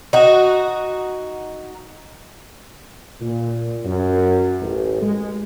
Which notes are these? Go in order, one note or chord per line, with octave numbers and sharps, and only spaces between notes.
D#4 F#4
A#2
F#2
A1
G#3